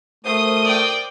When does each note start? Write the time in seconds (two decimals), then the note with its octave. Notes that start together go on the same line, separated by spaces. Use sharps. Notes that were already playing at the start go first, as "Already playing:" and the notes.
0.25 A3 F#4 A#4 C5 D#6
0.65 D5 G5